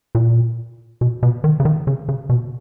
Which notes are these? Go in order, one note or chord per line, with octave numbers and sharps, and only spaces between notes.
A#2
B2
B2
D#3
C#3
D#3
C#3
C#3
B2